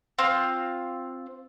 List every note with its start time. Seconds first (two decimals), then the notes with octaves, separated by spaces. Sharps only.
0.19 C4 F4